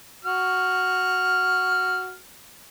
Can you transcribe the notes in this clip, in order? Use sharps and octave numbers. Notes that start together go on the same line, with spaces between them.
F#4 F6